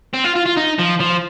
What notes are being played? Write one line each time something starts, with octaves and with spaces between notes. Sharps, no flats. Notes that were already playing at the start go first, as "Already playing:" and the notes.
C4
F4
F4
F4
D#4
F3
F3